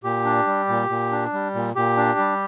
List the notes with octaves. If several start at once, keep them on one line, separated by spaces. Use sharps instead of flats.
A#2 G4
D4
G3
A#2
A#2
D4
G3
A#2
A#2 G4
D4
G3